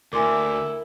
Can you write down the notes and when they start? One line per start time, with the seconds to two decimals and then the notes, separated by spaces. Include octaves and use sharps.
0.13 D2 E4 A#4 G#5 C6 D6